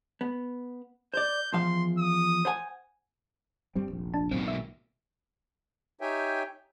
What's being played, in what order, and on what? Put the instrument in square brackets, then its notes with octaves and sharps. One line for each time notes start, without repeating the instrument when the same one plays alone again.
[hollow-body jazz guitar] B3
[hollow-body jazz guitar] C5 D5 [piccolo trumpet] G6
[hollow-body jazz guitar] E2 F3 F5 [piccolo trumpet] C6
[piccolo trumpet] D#6
[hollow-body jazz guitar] C5 F#5 G#5
[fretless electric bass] G2 G3 C4
F1 A#1
[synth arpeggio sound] D4 A5
[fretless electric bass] B1 G#2 D#3 [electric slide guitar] B2 A#3 [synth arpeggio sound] C4
[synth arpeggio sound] E5
[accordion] D#4 G4 C#5 E5 G5 G#5